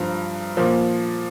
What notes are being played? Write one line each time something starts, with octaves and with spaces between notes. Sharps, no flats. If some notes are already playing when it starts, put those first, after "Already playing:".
Already playing: G2 F3 A#5
A#2 F3